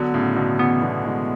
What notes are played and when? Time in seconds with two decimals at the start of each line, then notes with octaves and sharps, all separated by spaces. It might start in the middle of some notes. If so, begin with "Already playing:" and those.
Already playing: D3 F#3 B3
0.14 A2 C#3
0.36 B2 D3
0.59 C#3 E3 B3
0.82 B2 D3
1.05 E3 G#3